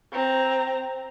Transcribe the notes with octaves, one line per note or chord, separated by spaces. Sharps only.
C4 A#5